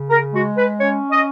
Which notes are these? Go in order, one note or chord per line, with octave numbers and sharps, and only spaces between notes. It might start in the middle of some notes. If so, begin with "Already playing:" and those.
Already playing: C#3
A#4
G#3 F#4
B4
C#4 C#5
D#5